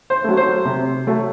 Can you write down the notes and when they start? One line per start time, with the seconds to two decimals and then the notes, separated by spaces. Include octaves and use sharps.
0.10 C5
0.24 F#3 A3
0.37 C5
0.65 C3
1.07 F#3 A3